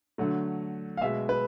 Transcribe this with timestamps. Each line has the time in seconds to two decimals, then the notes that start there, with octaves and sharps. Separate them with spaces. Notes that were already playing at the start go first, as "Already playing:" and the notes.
0.18 D3 F#3 A3
0.97 F5
1.01 B2 G#3 E5
1.29 B4